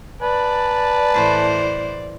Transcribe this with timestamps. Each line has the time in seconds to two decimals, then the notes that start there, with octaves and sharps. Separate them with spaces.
0.22 B4 D5 A5
1.13 A2 E3 C5